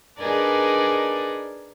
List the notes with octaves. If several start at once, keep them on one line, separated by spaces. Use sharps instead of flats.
D4 D#4 G#4 A#4 B4 D5